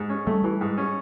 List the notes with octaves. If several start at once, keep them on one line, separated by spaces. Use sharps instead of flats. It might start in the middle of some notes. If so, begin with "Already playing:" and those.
Already playing: G#2
C#4
G3 A3
E3
G#2
C#4